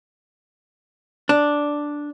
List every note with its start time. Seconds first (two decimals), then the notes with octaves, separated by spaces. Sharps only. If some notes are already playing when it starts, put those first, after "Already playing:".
1.29 D4